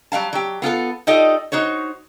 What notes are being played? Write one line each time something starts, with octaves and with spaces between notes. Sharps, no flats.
F#3 G3 F5 A5
F#3 G4
B3 F4 G4 A4
D#4 F4 G4 A4 D5 D#5
D#4 F#4 C5 C#5